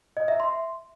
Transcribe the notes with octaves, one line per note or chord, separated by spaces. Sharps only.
D#5
E5
C6